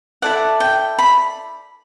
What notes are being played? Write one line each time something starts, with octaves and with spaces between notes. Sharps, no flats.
E4 A4 D5 F#5
G5
B5